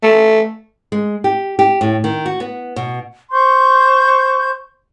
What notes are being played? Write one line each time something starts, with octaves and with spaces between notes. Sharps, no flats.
A3
G#3
G4
G4
A2
D#3
F#4
B3
B2
C5 C6 C#6 G6